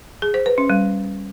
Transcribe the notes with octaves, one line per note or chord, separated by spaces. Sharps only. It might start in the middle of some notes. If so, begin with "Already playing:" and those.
G#4
C5
B4
C#4
G3